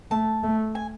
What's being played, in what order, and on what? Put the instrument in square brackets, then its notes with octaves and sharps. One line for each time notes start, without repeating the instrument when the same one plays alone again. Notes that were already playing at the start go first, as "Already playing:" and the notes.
[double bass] A3 [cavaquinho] A5
[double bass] A3
[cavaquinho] G#5